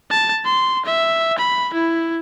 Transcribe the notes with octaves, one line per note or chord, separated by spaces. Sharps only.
A5
C6
E5
B5
E4